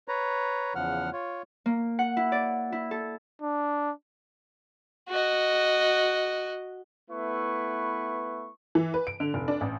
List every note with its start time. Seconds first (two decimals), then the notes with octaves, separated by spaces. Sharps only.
0.08 B4 C#5 A#5
0.75 E2 C#3 F3 F#5 F6
1.13 F4 C#5
1.66 A#3
1.99 F#5
2.17 E4
2.32 D5
2.72 E4
2.91 A4
3.42 D4
5.09 F#4 D#5
7.11 A3 B3 E4 B4 B5 C#6
8.75 E3
8.94 B4
9.07 D7
9.20 D3
9.34 F1
9.48 D4
9.61 A1